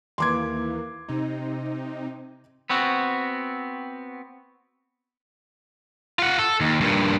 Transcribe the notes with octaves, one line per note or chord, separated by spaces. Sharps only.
D#2 E3 A#3 C6 D6 G#6
C3 C4 D#4
B3 C4 F#4
F4 F#5
A4
D#2
G2 A#2